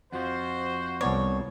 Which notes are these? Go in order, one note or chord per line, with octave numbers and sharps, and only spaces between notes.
F2 F3 F#4 C5
C2 B3 C#5 D5